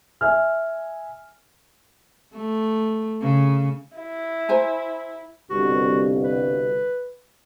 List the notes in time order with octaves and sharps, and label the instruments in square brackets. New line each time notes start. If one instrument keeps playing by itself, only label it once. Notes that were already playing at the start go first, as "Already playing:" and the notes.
[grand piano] E5 G#5 F6
[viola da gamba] A3
C#3
[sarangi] E4
[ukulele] C5 G#5 A#5
[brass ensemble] G1 C2 B2 [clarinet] F#4
[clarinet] B4